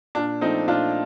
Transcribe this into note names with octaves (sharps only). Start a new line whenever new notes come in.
A#2 D4
F3 A3 C4 D#4
A#2 D4 F4